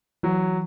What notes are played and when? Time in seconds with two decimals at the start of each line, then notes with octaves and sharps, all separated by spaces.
0.23 E3 F#3